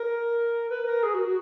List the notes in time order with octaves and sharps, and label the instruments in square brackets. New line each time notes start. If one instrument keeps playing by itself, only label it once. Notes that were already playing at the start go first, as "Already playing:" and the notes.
Already playing: [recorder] A#4
B4
A#4
G#4
F#4
F#4